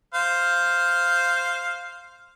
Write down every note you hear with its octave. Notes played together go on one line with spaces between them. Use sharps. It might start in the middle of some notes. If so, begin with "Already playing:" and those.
C5 F5